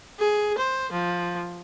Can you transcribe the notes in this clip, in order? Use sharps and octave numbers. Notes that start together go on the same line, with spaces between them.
G#4
C5
F3